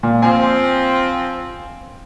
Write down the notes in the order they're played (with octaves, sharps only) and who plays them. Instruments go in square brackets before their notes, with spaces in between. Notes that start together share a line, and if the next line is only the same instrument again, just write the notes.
[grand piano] A#2
[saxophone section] F3 C4 [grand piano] G#5